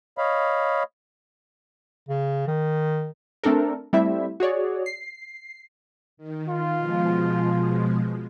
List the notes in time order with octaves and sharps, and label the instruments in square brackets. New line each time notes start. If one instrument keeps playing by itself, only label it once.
[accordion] C#5 D#5 F5 B5
[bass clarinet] C#3
D#3
[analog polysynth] A3 C4 D4 A4 A#4
G3 A3 C4 E4 E5
F#4 G#4 C#5 D5
C7
[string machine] D#3
[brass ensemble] F4
[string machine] B2 F3 G#3